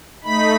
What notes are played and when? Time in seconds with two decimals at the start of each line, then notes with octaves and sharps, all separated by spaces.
0.24 A3 D#4 B5